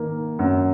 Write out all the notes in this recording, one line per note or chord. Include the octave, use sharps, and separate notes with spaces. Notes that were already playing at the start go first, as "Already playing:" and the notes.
Already playing: D#3 A#3
F#2